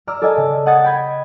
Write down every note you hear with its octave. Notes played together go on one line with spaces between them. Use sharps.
D5 A#5 D6 E6 F6
A4 D5 D#5 G#5 A5
C#3
D#5 F#5 D#6 G#6 A6 C#7
G5 B5 G#6